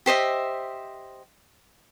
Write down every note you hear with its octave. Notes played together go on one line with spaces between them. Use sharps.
G4 C5 D#5 E5